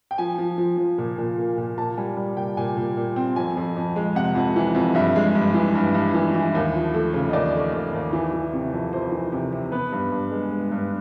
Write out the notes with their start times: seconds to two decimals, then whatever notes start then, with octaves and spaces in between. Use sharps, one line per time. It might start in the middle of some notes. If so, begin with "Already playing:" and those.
0.11 G5
0.18 F3 G#5
0.38 F3
0.58 F3
0.78 F3
0.98 A#2
1.18 A#2
1.38 A#3
1.58 A#2
1.77 A#2 A5
1.97 G3 G#5
2.17 G3
2.37 A#2 G5
2.57 A#2 G#5
2.77 A#2
2.97 A#2
3.16 C4
3.36 F2 G#5
3.57 F2
3.76 F2
3.96 G#3
4.15 C3 F#5
4.35 F2
4.56 E3
4.75 F2
4.95 G2 E5
5.16 G#3
5.35 G2
5.54 E3
5.75 G2
5.94 G2
6.14 E3
6.34 E3
6.55 D#2
6.75 F3
6.94 A3
7.14 C#3
7.29 D#5
7.33 D#2 D5
7.54 A3
7.73 D#2
7.93 D#2
8.13 E3
8.33 E3
8.53 C3
8.73 F2
8.93 F2 C5
9.12 E3
9.32 C3
9.52 C3
9.72 B3 B4
9.92 G2
10.12 G2
10.31 G#3
10.51 G#3
10.72 G2